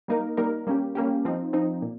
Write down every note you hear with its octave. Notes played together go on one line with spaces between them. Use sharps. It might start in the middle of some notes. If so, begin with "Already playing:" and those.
G3 A#3 D#4 A#4
G3 A#3 D#4 A#4
G3 A#3 C#4 G4
G3 A#3 C#4 G4
F3 C4 D#4
F3 C4 D#4
A#2